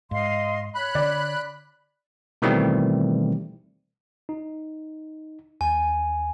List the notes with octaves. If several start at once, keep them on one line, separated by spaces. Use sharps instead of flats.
G#2 D#5 F5 C6
C#5 B5 F#6
D3 D5
B2 D#3 E3 G3 A3 C4
D#4
D#2 G#5